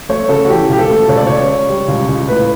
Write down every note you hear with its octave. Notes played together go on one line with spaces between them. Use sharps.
A3 C#5
C#3 A4
F#4
E3 G4
C#2 G4
A4
A3
C#2 C#5
D5
C#2 C#5
C#3
G3
C#2
C#2
A2 B4